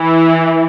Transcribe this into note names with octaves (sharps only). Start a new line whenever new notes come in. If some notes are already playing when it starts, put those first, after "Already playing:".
Already playing: E3